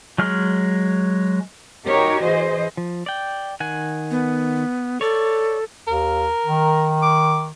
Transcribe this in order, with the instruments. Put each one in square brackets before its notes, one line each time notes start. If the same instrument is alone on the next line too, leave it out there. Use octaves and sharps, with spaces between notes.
[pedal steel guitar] F#3 G#3 F6
[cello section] D#4 F#4 G4 A#4 C#5
E3 G#4 C5 D#5
[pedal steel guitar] F3
D5 G5
D#3 F#5 G#5
[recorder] B3
[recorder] A4 [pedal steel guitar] C#5 D5
[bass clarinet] D#2 [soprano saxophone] A#4
[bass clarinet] D#3
[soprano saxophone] D6